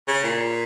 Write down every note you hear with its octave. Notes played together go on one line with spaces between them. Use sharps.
C#3
A#2